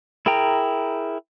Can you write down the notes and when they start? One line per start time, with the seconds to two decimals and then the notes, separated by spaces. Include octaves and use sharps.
0.26 E4 G#4 A#4 G5 A#5